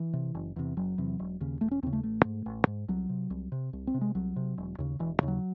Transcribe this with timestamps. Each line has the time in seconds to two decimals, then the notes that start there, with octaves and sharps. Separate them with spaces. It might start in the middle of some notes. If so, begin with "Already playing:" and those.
Already playing: E3
0.13 C3
0.35 F#1
0.56 E2 C3
0.77 F#1 F#3
0.98 E2 C3
1.19 E1
1.41 D#2 C#3
1.61 E1 A3
1.71 C#4
1.83 D#2 C4
1.87 C#3
1.93 A3
2.03 A1 A3
2.25 G#2
2.46 A1
2.67 G#2
2.88 C2 F#3
3.09 C3
3.30 C2
3.52 C3
3.73 C2
3.87 C4
3.94 C3
4.01 G#3
4.15 C2 F#3
4.36 C3
4.58 E1
4.78 D#2 C#3
4.99 E1 E3
5.21 D#2 C#3
5.28 F#3